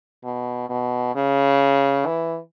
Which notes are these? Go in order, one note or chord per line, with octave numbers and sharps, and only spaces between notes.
B2
B2
C#3
E3